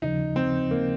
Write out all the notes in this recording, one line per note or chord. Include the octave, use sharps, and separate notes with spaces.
D#2 C#3 F3 D#4
C4
A#3